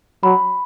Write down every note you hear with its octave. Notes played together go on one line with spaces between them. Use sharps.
F#3 B5